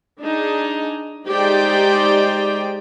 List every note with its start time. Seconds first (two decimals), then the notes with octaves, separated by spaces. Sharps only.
0.20 D4 D#4 G#4
1.28 G#3 D#4 G4 C5 D5 G5